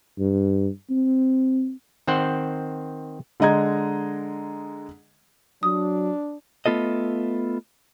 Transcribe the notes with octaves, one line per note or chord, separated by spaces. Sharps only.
G2
C4
D#3 C4 C5 F#5
D3 G#3 D#5 A#5 G#6
F#3 D4 D#6
A3 B3 F4 A4 D#5